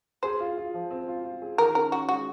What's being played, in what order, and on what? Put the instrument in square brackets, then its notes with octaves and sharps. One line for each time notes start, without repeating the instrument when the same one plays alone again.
[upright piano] G#4 [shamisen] C5
[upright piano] F4
F4
F3
C4
F4
F4
G#4
[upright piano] D#3 [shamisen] A#4
[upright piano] C#4 [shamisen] A#4
[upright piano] C#4 [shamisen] F#4
[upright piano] G#3 [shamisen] F#4